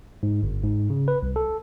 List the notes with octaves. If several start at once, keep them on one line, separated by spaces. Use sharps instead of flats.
G#2
G1
G#2
C#3
B4
C2
A4